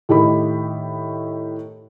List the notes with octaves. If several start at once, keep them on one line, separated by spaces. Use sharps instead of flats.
A2 D#3 G4 D#5 B5